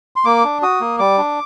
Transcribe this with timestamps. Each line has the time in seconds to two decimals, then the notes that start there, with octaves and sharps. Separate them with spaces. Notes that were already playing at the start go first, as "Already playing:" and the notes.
0.16 C6
0.25 A#3 D6
0.44 D4
0.62 F#4 D#6
0.81 A#3
0.99 G3 D6
1.18 D4